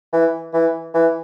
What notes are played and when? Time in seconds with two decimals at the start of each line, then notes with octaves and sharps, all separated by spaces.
0.13 E3
0.54 E3
0.94 E3